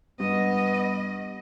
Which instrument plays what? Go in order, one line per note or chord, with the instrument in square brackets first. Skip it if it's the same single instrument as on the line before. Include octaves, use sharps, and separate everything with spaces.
[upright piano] G2 [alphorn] B3 [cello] D#5